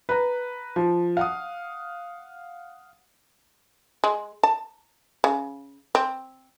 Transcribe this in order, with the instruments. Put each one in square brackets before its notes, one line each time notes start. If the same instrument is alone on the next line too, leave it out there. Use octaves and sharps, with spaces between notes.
[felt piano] B4 A#5
F3
F5 F#5 D#6
[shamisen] G#3
A5
C#3
C4